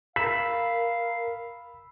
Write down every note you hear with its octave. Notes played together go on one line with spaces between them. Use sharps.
A#4 F5 B5 E6 B6